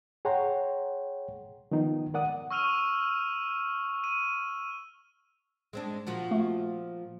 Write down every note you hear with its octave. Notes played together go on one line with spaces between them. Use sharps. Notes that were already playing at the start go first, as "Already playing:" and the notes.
G#4 C#5 F#5 G5 A#5 C6
D#3 F3 B3 D#4
A#4 D5 F#5 D#6
C#6 E6 F6 D#7 F7
D#7
G#3 C4 D4
A#2 F3 F#4
A3